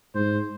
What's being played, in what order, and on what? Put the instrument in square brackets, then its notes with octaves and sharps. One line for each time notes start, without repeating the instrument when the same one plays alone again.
[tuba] G#2 [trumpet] C5